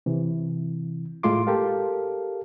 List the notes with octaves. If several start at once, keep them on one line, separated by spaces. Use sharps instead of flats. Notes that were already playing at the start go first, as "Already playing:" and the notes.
C3 E3
A2 G#3 A3 F4 C6 D6
G4 A4 A#4 F5